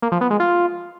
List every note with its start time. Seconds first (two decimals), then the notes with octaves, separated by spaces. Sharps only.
0.02 A#3
0.12 F3
0.21 B3
0.30 G#3
0.40 F4